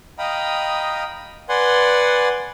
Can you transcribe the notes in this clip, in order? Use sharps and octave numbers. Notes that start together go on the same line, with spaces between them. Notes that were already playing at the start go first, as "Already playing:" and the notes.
D#5 F5 G5 A#5 B5 D#6
B4 D5 F#5 G#5 C6